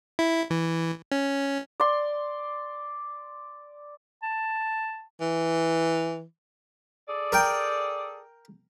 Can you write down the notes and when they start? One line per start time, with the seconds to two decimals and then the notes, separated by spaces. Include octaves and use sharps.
0.19 E4
0.50 E3
1.12 C#4
1.80 D5 C6
4.23 A5
5.21 E3
7.07 G#4 A4 D5
7.32 A#4 G5